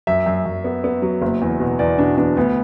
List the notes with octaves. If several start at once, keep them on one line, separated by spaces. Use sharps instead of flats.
F#2 E5
F#2
F#2
B3
B3
F#3
F#1
E2
B2
E2 D5
B2 D4
E2 D4
D2 B3